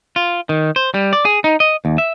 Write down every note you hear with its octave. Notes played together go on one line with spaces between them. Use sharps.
F4
D#3
C5
G3
D5
G#4
D#4
D#5
D#2
E5